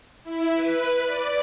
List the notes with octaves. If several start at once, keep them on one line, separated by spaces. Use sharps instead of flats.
E4
B4
D5